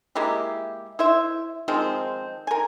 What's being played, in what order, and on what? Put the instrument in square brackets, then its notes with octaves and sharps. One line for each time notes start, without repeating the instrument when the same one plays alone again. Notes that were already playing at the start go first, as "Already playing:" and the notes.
[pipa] G#3 A#3 E4 G4
E4 C5 E5
D#3 F3 G#3 C4
A#4 G#5